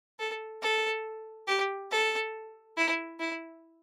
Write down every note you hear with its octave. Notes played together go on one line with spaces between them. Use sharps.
A4
A4
G4
A4
E4
E4